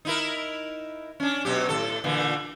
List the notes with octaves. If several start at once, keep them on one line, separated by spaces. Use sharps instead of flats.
D#4 E4 A#4
C#4 D4
B2 F#3 G4
A2 D3 A4
A#2 D3 E3